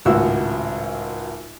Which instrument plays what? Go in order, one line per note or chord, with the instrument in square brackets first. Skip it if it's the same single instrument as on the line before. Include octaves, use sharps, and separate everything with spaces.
[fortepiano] G#1 C#2 A2 F#4 E6